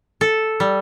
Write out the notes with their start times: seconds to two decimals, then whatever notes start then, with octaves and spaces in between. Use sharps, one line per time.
0.21 A4
0.60 G3